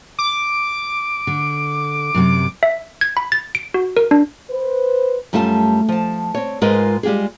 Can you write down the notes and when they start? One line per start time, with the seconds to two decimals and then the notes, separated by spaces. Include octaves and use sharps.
0.19 D6
1.27 D3
2.14 F#2 A2 C3
2.63 E5
3.01 G#6
3.17 B5
3.32 A6
3.55 D7
3.74 F#4
3.97 A#4
4.11 D4
4.50 B4 C5
5.33 F#2 G3 A3 F4 G#5 A5
5.88 F3 A5
6.34 C4 C#5
6.61 G#2 G#3 F4 A#4 B4 D#5
7.03 G3 G#3 F4 G4 G#4